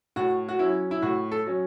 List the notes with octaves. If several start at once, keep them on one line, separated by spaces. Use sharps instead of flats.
A2 F#4
F#4
F#3 C#4 E4
E4
A2 F#4
A4
F#3 C#4